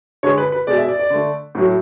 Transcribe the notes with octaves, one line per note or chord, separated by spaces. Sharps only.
D3 G#3 C#5
B4
B4
B2 G#3 D5
E5
D5
D5
D3 A3
A2 F#3 A3